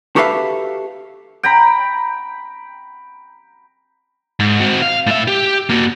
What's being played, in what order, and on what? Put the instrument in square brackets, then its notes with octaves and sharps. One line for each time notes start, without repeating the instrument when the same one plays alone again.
[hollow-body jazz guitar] F#4 G4 A4 B4 E5 F5
[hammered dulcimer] G5 A#5 B5
[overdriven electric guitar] G#2
C4 F#4
F5
A2 E5
G4
A#3 F#4